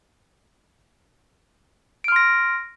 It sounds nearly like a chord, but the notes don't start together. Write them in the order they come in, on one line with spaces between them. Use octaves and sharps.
D7 F6 C6 A#6